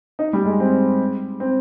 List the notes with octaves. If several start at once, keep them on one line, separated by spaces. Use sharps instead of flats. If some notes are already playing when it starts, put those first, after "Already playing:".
D#4
G3
G#3
C4
C4